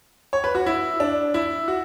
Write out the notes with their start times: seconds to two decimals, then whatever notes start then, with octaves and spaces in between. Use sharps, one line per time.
0.33 C#5
0.44 B4
0.55 F#4
0.66 E4
1.00 D4
1.34 E4
1.68 F#4